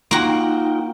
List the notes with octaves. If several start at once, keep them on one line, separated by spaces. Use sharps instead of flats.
A#3 D#4 F4 F#4 G5